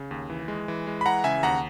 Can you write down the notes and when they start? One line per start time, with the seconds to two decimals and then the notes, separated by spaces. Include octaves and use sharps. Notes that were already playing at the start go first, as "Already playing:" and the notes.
Already playing: C#3
0.11 D#2
0.30 E3
0.48 G#3
0.68 E3
0.87 G#3
1.01 B5
1.06 E3 F#5 A#5
1.24 C#3 E5 G#5
1.43 D#2 F#5 A#5